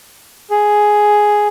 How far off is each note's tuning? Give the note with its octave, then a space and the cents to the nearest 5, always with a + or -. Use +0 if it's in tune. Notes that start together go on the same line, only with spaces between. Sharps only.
G#4 +5